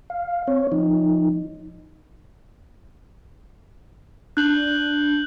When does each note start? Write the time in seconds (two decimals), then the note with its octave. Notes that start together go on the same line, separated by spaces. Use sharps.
0.10 F5
0.48 C4 C#5
0.72 F3 D#4
4.37 D4 F#6 G6 F#7